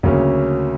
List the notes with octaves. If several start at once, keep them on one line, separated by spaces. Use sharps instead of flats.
D2 C#3 F#3 A#3 C#4